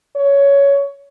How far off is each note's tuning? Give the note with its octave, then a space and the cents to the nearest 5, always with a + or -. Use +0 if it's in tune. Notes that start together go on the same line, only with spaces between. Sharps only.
C#5 +15